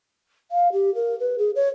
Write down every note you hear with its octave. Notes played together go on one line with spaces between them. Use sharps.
F5
G4
A#4
B4
G#4
C#5